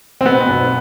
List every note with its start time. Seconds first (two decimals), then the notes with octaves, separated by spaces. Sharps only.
0.21 C4
0.25 B2 B3
0.49 B1